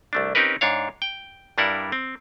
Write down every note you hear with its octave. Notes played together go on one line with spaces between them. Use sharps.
C2 A3 D4
C4 C#4 D#4 G4 A#4 B4
G#2 D4 C#5 F5
G5
G2 G3 D4 E4 A#4 F#5
C4